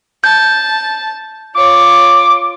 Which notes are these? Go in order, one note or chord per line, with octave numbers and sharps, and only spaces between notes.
A5 G6
F4 C#5 D6